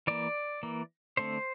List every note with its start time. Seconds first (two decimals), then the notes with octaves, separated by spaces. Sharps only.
0.07 E3 A#3 D5
0.63 E3 A#3
1.17 D3 A3 C4 C5